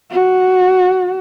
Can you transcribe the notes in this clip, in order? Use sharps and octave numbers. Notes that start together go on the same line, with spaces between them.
F#4